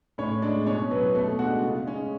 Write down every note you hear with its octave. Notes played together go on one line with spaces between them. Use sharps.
A2 C#4 C#5
G#3 D4 D5
B2 C#4 C#5
F#3 B3 B4
B2 A3 A4
G#3 D4 F#4 F#5
C#3
G#3 C#4